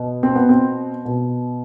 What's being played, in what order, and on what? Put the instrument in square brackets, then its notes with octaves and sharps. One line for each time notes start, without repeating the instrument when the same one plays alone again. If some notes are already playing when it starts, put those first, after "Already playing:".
Already playing: [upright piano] B2
C4
B3
C4
B2